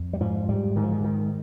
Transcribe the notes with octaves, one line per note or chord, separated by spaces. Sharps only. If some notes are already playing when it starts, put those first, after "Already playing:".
Already playing: F2
G3
G#2 F3
G#2 G3
G#2 D#3
F3
D#3
G#2 D#3